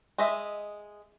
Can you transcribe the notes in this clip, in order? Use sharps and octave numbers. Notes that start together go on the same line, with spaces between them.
G#3 D#5 E5